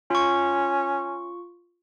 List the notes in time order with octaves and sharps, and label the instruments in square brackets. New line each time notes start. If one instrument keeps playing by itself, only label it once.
[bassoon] C#4 [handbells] F4 C#6